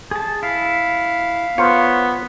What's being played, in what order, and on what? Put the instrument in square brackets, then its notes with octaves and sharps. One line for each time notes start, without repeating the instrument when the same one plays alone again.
[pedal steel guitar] G#4 A5
[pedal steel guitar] E4 [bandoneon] F5
[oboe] B3 [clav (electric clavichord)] F4 A#4 C5 [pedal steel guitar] C#5